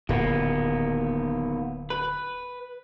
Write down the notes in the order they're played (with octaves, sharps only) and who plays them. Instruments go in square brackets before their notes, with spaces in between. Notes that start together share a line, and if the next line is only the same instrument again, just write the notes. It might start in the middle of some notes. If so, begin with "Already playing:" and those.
[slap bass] D1 A#2 [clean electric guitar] D#2 A#3 B3
[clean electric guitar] B4